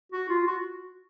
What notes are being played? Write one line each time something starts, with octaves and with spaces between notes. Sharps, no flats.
F#4
F4
F#4